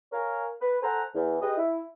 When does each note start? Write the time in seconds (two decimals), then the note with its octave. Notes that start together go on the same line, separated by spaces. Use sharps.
0.13 A#4 C#5 F5 G#5 A#5
0.62 B4
0.83 A4 C5 F#5 G#5 A#5
1.15 E2
1.42 G4 G#4 B4 D#5
1.58 E4